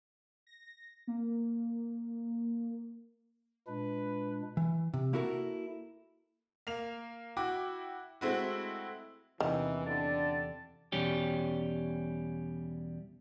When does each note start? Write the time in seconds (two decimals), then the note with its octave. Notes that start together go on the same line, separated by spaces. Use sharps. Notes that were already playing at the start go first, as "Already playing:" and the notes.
0.47 A#6
1.07 A#3
3.68 A#2 G#3 D4 B4
4.57 E3
4.94 C3
5.13 A#3 E4 F#4 A4 A#4
6.67 A#3 F7
7.37 E4 F#4 G5 D6
8.21 G#3 A3 C4 E4 F#4
9.40 E2 C3 D#3 E3 C#4
9.86 D3 D5 G5 A5
10.92 E2 B2 G3 C#4 G4